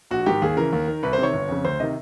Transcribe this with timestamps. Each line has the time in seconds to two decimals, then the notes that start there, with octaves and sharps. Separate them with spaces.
0.11 A#1 F#4
0.26 G#2 D#3 G4
0.42 D#2 G#4
0.57 C#3 E3 A#4
0.73 D#2
0.88 D#3
1.03 C2 B4
1.13 C5
1.18 C3 D#3 C#5
1.33 G1
1.49 F2 C#3
1.65 D2 C5
1.80 C3 D#3 D#5